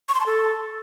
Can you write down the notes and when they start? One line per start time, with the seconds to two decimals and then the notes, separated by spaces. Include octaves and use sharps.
0.09 C#6
0.15 C6
0.20 A5
0.26 A4